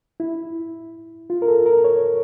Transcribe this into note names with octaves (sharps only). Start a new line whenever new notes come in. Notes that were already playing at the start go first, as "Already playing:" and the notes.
E4
F4
A#4
A4
A#4
C#5